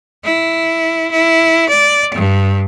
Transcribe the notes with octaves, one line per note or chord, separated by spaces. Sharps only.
E4
E4
D5
G2